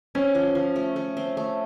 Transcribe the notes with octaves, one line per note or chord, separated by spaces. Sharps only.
C4 C#4
F3
F3
A3
A3
C4
A3